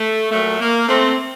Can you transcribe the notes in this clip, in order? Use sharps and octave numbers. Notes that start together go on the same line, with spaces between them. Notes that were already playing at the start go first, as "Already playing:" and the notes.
Already playing: A3
A#2 F#3 A3
A#3
A3 C4